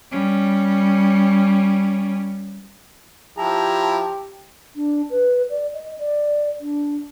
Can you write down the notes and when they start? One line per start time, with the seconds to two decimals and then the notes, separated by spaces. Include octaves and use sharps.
0.11 G3 C#4
3.38 F3 E4 G4 A5 A#5
4.76 D4
5.10 B4
5.50 D5
5.74 D#5
5.99 D5
6.60 D4